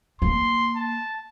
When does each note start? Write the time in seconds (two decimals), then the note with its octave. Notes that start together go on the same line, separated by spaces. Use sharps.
0.22 A#3 C6
0.76 A5